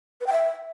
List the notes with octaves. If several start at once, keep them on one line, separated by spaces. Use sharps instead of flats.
B4
G5
E5